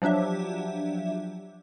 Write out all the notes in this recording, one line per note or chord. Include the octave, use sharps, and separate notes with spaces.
F3 F#3 D4 G4 E5